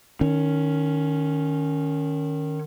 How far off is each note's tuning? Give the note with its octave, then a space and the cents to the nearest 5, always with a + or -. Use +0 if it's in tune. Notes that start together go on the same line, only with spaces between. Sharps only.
D#3 -15 C#4 +10